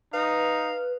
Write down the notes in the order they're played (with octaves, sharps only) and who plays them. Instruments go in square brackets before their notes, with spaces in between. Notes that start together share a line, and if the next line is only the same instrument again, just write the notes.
[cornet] D#4 [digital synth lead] B4 [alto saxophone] F5